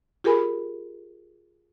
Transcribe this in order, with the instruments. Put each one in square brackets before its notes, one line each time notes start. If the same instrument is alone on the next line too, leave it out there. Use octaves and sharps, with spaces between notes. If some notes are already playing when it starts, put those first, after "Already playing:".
[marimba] F4 G4 G#4 A#4 G#5 B5